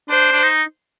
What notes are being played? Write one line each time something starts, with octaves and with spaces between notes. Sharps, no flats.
D4 C5
D4
D#4